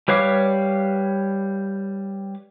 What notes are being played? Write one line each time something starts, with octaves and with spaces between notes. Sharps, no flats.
G3 B4 C#5 F5 D6